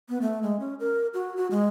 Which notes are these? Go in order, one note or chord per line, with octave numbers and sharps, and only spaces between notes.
B3
A3
G#3
C#4
A#4
F#4
F#4
G#3